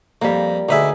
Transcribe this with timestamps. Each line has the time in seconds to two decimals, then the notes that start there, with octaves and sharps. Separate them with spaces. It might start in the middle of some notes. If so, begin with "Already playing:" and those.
0.22 F2 G3 A#3
0.69 D2 D#4 G#4 B4 E5